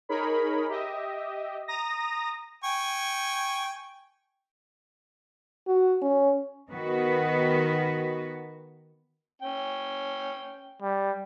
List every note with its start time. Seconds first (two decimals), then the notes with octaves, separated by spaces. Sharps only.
0.09 D#4 G#4 A#4 C#5 B5
0.69 G4 D#5 E5
1.68 A#5 D#6 A#6
2.64 G5 G#5 C#6
5.67 F#4
6.02 C#4
6.70 D#3 B3 F#4 B4
9.42 C#4 G5
10.82 G3